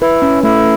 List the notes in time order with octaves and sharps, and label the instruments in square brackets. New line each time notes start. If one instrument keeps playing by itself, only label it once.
[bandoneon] E4 [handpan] B4
[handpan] C#4
[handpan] A3 [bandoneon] E4